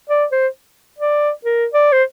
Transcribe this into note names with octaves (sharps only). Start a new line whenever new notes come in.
D5
C5
D5
A#4
D5
C5